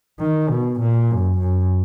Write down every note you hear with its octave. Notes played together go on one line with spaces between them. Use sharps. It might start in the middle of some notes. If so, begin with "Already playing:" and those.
D#3
B2
A#2
F#2
F#2